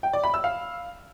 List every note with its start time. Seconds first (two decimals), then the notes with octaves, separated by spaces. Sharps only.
0.03 G5
0.13 D5
0.24 B5
0.34 E6
0.44 F5